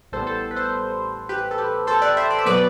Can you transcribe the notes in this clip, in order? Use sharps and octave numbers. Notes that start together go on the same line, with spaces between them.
A1 A2 G3 B3 A4 C5
A4 C5
B4
A4 C5
G4 B4
A4
G4 B4
A4 C5
B4 D5
C5 E5
D5
E5
B2 F#3 B3 B4 D5